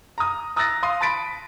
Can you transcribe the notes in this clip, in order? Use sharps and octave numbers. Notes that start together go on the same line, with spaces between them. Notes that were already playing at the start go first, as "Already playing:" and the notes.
A#5 D#6
A#5 D#6 E6 F#6 A6 A#6
F5 C6 D#6 D#7
A5 B5 A6 B6 D7